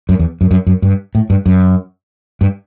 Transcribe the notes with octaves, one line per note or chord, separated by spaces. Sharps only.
F#2
E2
F#2
F#2
F#2
G2
A2
G2
F#2
G2